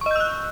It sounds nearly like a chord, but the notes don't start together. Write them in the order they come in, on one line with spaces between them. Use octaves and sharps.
C#6 D#5 G6 E6 F#6